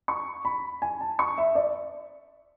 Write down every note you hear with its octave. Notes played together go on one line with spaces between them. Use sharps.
C#6
B5
G#5
A5
C#6
E5
D5